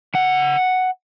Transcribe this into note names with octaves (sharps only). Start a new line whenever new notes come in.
C#3 F#5